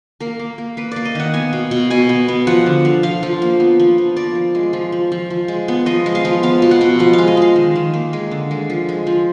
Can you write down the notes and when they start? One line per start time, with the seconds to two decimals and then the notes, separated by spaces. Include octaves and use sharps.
0.20 A#3 A#4
0.39 A#3
0.58 A#3
0.77 A#3 B4
0.92 A#3 D5
1.05 D#5
1.15 D#3 F#5
1.34 B3 G#5
1.53 B2
1.71 B2
1.90 B2 G#5
2.09 B3
2.28 B3
2.47 F3 F#5
2.66 D3
2.85 F3
3.03 F3 F5
3.23 F3
3.42 A#3
3.60 B3
3.80 F3
3.98 F3
4.16 F3 D5
4.35 F3
4.55 G#3
4.73 F3
4.92 F3
5.12 F3
5.30 F3
5.48 G#3
5.68 B3
5.86 F3 D#5
6.06 G#3
6.15 F5
6.25 F3
6.43 B3 F5
6.62 B2
6.71 F#5
6.81 B2
6.99 F3 F#5
7.13 F5
7.18 G#3
7.28 D#5
7.37 G#3 F5
7.56 D#3
7.75 D#3
7.93 A#3
8.13 G#3
8.31 D3
8.51 G#3
8.70 F3
8.89 G#3
9.07 F3